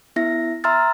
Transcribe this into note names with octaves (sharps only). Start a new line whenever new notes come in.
B3 E4 E5 A#6
E5 A#5 C6 E6 F6 A6